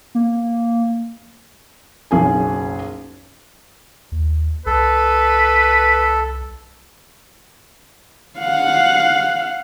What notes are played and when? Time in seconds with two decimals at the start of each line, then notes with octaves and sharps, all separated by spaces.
0.15 A#3
2.11 F#1 B1 G#4 G#5
4.12 D#2
4.66 C2 A4 B4
8.39 F5 F#5